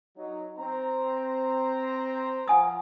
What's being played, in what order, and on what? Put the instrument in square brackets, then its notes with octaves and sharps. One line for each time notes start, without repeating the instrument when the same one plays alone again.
[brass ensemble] F#3 D#4
C4 C5 A#5
[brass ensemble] F3 [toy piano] F#5 G#5 D#6